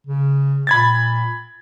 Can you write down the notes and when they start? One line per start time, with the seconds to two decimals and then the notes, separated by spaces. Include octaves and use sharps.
0.07 C#3
0.67 A#2 B5 G#6 A6